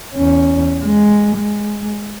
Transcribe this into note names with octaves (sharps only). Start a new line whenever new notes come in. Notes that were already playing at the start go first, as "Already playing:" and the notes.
E2 C#4
G#3
G#3